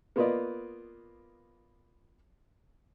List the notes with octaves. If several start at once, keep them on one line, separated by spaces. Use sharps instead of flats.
A#3 B3 F4 B4 D5 D#5